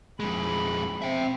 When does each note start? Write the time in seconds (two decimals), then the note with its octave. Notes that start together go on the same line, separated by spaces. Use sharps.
0.20 F2 G#3 B5
1.02 C4 E5 G5